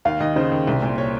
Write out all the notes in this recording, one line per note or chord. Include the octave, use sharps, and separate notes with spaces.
D#2 F5
D#2 D#5
C#3 C5
D#2
C2
A#2
C#5